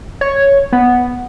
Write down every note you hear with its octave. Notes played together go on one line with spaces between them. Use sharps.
C#5
B3